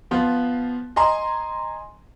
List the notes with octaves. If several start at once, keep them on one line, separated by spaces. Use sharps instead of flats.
F3 B3 F4
D#5 G#5 A#5 C6